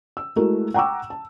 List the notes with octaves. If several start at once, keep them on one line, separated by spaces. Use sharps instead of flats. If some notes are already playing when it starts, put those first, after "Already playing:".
E6
G#3 A3 E4 F#4 A#4
F#5 G5 A#5 C#6 D6 E6
A5